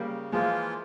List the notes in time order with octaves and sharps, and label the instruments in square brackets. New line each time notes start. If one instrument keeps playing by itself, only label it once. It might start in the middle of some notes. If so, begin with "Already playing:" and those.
Already playing: [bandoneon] C#3 [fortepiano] G3 A#3
[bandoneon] E3 A#3 F4 [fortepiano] F3 G#3